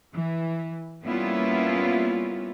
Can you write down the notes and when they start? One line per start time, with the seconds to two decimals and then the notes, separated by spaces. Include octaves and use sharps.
0.15 E3
1.03 G3 A#3 B3 C#4 E4 F4